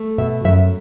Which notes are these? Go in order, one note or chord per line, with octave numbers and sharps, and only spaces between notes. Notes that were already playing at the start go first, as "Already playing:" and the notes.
Already playing: A3
B2 E5
F#2 E5